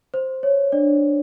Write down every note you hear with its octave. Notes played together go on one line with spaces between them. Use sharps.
C5
C#5
D4 D5